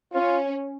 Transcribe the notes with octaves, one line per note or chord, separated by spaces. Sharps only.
C#4 F4